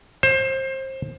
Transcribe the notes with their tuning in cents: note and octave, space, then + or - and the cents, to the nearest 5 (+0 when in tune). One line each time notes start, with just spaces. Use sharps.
C5 +25